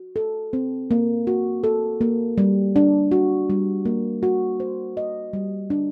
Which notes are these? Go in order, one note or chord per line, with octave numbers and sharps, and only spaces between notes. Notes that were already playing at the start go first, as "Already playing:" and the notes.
Already playing: F#4
A4
C4
A#3
F#4
A4
A#3
G3
D4
F#4
G3
A#3
F#4
C5
D#5
G3
D4